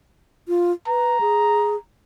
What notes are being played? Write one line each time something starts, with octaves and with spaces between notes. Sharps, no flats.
F4
B4 A#5
G#4